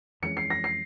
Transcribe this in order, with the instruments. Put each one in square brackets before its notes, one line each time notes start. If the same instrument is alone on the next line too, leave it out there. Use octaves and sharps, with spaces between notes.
[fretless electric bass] F2 E3 G#3 C#4 [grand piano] C#7
[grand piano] C7
A#6
C7